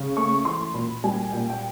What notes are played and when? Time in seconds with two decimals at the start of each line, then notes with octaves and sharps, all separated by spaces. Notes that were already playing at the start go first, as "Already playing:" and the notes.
Already playing: C#3
0.17 A3 C#6
0.45 E3 C6
0.74 A#2 B5
1.04 G3 G#5
1.33 A#2 G5
1.50 G5